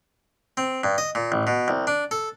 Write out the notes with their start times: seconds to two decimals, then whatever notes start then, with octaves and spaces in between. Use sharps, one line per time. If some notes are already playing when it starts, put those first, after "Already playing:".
0.57 C4
0.84 G2
0.98 D#5
1.15 A#2
1.32 A1
1.47 B2
1.68 C2
1.87 D4
2.11 A4